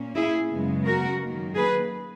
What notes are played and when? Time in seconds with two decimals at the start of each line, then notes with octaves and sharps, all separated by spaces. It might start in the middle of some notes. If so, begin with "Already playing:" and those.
Already playing: A#2 A#3 C#4
0.15 E4 G#4
0.49 F#2 C#3 G#3 B3
0.85 F#4 A#4
1.20 F#2 D#3 F#3 A#3
1.55 G#4 B4